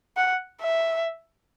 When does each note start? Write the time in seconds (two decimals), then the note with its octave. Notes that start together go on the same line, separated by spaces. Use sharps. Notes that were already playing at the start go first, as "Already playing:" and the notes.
0.17 F#5
0.61 E5